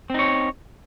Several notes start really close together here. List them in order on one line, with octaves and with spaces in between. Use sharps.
C4 D#4 C#5